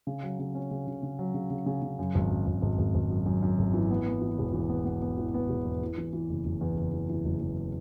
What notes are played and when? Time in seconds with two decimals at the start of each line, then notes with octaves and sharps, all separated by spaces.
0.07 C#3
0.23 F#3
0.39 C#3
0.55 C#4
0.71 C#3
0.87 C#3
1.03 C#3
1.19 F#3
1.34 C#3
1.50 C#3
1.66 C#3
1.82 C#3
1.99 F#2
2.15 G#1
2.31 F#2
2.46 G#1
2.62 G#1
2.78 G#1
2.95 G#1
3.10 F#2
3.26 F#2
3.42 F#2
3.59 G#1
3.74 E3
3.91 B3
4.06 B3
4.22 E3
4.38 E1
4.54 E3
4.69 B3
4.85 B3
5.02 B3
5.18 E3
5.34 B3
5.49 E1
5.65 E2
5.81 E3
5.98 E3
6.13 E3
6.29 F#1
6.45 F#1
6.61 E2
6.77 F#1
6.93 E3
7.10 E3
7.25 F#1
7.41 E2